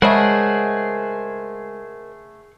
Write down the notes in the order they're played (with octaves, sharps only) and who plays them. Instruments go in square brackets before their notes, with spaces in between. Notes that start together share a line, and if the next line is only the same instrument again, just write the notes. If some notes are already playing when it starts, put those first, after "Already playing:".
[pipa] C#3 A3 [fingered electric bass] G#3 [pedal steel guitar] G#4 F#5 [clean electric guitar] A#4 C5 D#5